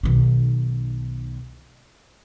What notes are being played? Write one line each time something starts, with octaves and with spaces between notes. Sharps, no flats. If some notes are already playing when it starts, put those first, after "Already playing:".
B1 D#3